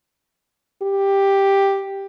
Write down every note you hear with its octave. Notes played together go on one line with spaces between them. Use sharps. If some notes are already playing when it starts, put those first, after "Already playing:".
G4